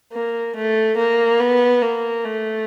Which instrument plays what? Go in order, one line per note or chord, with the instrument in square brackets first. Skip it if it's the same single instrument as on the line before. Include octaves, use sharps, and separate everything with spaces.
[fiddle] A#3
A3
A#3
B3
A#3
A3